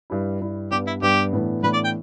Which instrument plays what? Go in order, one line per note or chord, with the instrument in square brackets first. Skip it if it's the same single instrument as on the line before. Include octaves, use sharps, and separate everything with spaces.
[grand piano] G2 G3 E4
G2 G3 E4
[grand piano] G2 G3 B3 D4 [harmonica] G4
[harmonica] E4
[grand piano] G2 G3 B3 D4 [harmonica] G4
[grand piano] A2 E3 B3 D4
[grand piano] A2 E3 B3 D4 [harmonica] B4
[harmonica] D5
G5